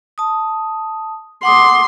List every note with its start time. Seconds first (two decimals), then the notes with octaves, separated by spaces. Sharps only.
0.18 A5 D#6
1.43 F#5 C6 D6 D#6